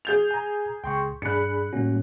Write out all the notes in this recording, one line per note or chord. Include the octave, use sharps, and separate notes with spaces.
G#4 G6 F7
G#5 A#5
C#2 G5 C6 C#6
G2 D4 G#4 B5 F#6 C#7
A2 G3 A#3 C#4 F#4